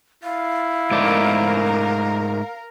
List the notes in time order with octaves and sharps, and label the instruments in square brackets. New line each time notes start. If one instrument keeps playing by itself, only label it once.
[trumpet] E4 [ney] F5
[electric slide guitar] G#2 A3 D5 [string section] A#4